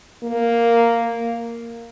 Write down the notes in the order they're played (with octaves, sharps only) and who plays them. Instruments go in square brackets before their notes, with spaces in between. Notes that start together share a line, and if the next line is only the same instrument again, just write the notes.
[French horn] A#3